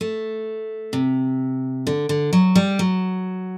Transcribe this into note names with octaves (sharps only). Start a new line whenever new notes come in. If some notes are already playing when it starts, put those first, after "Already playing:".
A3
C3
D3
D3
F#3
G3
F#3